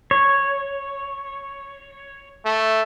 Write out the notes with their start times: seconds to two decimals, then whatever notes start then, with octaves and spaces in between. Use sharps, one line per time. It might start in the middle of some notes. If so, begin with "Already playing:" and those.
0.11 C#5
2.46 A3